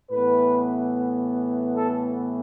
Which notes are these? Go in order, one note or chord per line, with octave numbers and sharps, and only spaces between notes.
A2 E3 B3 B4
A4